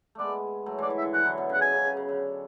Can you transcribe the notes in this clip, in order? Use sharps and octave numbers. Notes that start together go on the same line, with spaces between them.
G#3 A3 B3 D5
F#3 A3
E3 G#3 D5
E3
E5
D3
E3 F#5
D3 F#3
B2
C#3 F#5
B2 G#5
C#3
C#3
C#3
D3